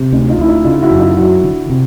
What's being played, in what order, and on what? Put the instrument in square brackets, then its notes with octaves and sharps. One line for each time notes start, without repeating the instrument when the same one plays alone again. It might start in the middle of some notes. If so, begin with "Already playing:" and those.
Already playing: [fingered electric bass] C3
[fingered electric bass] D2 [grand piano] C#4 D#4
[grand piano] D#4 F4
[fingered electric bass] D2 [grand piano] E4
[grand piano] D#4 F4
[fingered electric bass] C#3 [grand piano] D#4 F4
[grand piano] E4 F#4
[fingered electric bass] F#2
[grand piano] D#4 F4
[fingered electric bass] F#3 [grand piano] E4 F#4
[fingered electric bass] D3
C3